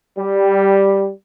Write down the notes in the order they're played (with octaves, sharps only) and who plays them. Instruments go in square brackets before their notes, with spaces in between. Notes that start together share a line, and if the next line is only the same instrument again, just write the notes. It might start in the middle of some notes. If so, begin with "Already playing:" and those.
[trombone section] G3